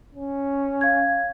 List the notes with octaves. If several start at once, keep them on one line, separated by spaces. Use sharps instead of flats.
C#4
F5 G#6